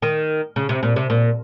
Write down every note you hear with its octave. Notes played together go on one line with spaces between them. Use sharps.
D#3
C#3
C3
A#2
C3
A#2